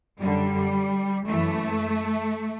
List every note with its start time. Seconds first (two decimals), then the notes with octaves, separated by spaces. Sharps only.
0.19 F#2 D3 G3
1.27 F#2 E3 A3